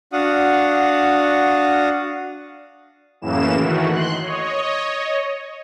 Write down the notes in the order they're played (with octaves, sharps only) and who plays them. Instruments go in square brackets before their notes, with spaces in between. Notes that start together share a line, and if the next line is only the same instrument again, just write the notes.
[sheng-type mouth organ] D4 F#4 F5 F#5 D#6
[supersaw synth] F#2 A2 C#3 E3 A#3 E7
D#3 E3 A3 F#4
C6 F#6
C#5 D#5